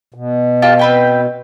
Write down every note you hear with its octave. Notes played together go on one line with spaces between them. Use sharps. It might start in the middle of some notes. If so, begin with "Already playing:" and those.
B2
F4 G4 A5
C4 B4 G5